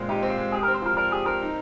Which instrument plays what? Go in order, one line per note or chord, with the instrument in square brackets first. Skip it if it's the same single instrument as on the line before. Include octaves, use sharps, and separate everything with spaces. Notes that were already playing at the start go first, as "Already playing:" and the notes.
Already playing: [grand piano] A#2 G#3 C4
[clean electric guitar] D#4 [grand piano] G4
[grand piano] C4
[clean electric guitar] F4
[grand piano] G#3
[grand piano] G4 [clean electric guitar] G#4
[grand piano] C4 [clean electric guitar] A#4
[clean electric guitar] C5
[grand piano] F3 [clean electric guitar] A#4
[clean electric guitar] A#4 [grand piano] D5
[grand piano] G4 [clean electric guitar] G#4
[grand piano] C4 [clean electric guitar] A#4
[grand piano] D#4